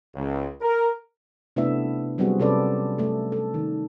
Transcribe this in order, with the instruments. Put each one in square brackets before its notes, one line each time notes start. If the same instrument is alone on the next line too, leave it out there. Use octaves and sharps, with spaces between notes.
[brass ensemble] C#2
A#4
[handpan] C3 A3 B3 D4 E4 E5
F#3 G3 B3 C4 F#4 G#4
C3 C#4 A4 B4 D5
A3 A4
A4
D#3